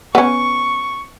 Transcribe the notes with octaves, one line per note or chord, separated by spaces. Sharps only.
B3 C#4 C#6